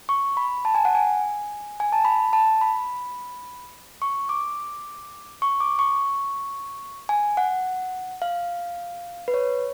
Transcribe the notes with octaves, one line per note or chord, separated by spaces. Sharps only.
C#6
B5
A5
G#5
F#5
G#5
G#5
A5
B5
A5
B5
C#6
D6
C#6
D6
C#6
G#5
F#5
F5
B4
C#5